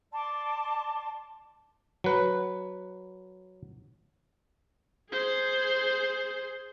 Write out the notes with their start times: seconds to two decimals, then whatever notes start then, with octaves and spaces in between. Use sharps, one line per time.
0.12 D5 A5 C6 D6
2.04 F#3 B4
5.11 G#4 C5